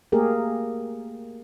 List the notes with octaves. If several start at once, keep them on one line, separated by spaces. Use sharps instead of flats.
A3 A#3 G4 G#4 A#4